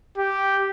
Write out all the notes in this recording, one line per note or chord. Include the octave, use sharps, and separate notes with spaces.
G4